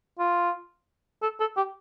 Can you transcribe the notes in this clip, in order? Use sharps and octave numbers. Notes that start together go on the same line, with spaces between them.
F4
A4
A4
G4